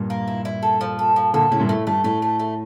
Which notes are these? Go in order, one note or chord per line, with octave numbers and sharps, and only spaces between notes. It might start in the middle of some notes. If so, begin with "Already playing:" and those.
Already playing: G2 A#2
A#3
E4
E4
A4
F3
A4
F3
A#2 D3 A4
A2 C#3 E4
G2 A#2
A2 A3
G2 A3
A2 A3
A3
A3